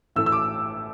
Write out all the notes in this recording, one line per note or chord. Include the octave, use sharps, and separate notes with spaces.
A1 A2 A3 E6
E6
D6